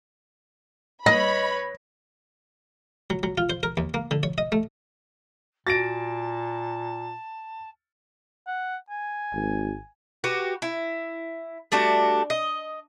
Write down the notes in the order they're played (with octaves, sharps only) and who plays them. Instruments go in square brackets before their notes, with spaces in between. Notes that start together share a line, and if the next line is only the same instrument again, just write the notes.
[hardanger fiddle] B4 C#5 [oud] D#5 [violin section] B5 [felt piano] A#6
[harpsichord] F#3
F#3
F4
C5
A#4
D#2
A#3
D3
C#5
D#5
A3
[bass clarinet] A#2 [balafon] F#4 [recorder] A5 [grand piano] A6 A#6 D7
[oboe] F#5
G#5
[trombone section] G#1
[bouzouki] F#4 G4 B4
E4
G3 A3 D4 F#4
D#5